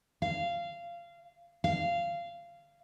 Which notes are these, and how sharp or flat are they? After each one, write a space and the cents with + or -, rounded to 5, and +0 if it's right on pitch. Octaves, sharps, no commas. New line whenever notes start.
F5 -20
F5 -20